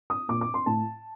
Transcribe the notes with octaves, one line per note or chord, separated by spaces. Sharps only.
D#6
A#2 D6
D6
C6
A2 A5